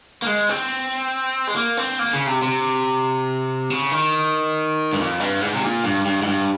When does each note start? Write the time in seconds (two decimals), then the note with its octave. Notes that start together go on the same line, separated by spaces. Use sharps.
0.22 A#3
0.27 G#3
0.49 C4
1.47 G#3
1.56 A#3
1.77 C4
1.99 A#3
2.13 C#3
2.27 C3
2.42 C3
3.70 C#3
3.92 D#3
4.93 G2
4.99 F2
5.20 G2
5.41 G#2
5.54 C3
5.63 A#2
5.84 G2
6.05 G2
6.22 G#2
6.27 G2